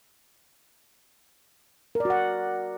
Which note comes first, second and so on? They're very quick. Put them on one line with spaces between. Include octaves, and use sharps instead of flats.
A#4 D5 F#4 F#5